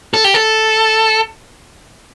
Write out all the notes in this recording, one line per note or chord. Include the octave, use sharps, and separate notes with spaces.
A4
G4
A4